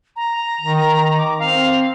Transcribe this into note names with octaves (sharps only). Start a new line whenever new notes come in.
A#5
D#3
D6
C4 F5